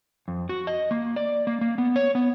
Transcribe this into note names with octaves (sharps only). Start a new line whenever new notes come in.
F2
F#4
D#5
A#3
D5
A#3
A#3
B3
C#5
B3